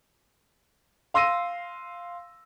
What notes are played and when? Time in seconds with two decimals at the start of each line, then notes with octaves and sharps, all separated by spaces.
1.14 F5 C6 E6 A#6 D#7